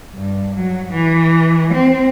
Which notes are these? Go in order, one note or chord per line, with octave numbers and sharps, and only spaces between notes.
G2
F#3
E3
C4